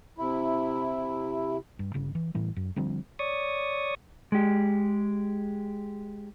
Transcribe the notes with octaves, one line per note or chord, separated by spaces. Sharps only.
C3 E4
G2
G1 C#3
E3
A2 E3 G3
F#2
D3 F3 G3 C4
C#5 D5 C#6 D#6
G#3 G4